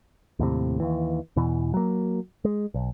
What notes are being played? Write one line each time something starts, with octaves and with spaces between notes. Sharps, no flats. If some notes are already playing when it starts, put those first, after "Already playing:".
D#2 A2 C3
D#2 E3
E2 B2 E3
F#3 A#3
G#3
B1